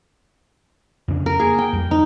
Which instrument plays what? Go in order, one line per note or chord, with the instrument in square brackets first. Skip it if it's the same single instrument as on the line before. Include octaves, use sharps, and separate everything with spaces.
[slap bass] F2 C#3 D4
[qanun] A#4
[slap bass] A#3 [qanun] G#4
[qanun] G5
[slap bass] F2 G3
[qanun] D#4